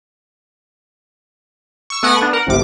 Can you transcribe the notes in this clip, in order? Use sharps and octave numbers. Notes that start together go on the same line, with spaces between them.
C#6 E6
A3 B3 F#5 G#5 A#6 D7
B3 D4
A#4 F#5
G1 C2 C3 D6